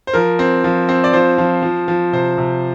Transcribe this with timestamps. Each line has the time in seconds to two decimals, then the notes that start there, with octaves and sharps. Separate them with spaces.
0.07 C5
0.14 F3 A#4
0.39 C4
0.64 F3
0.89 C4
1.04 D5
1.13 F3 C5
1.38 F3
1.62 F3
1.88 F3
2.13 C3 C5
2.38 C3